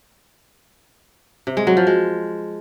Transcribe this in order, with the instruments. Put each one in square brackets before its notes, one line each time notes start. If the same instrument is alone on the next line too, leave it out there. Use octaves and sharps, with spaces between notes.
[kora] C3
G#3
F#3
F3
G#3